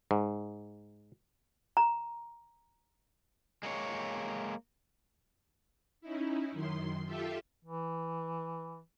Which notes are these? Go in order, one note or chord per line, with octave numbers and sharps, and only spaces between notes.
G#2
A#5
G#3 A#3 C#5
C#4 D#4 E4
F#2 D#3 C6
F4 G4 A4 E5
E3